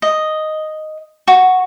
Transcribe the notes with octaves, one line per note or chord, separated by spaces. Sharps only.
D#5
F#4